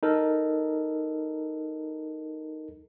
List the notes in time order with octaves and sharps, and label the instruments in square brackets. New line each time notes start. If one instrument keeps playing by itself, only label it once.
[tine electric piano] D#4 A4 A#4